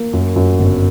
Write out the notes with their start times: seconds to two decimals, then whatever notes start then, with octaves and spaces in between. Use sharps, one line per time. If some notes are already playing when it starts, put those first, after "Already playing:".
Already playing: A#3
0.13 F#2
0.36 F#2
0.59 G1